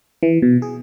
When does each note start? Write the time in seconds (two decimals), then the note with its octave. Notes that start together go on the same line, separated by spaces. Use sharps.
0.23 E3
0.42 B2
0.62 G#4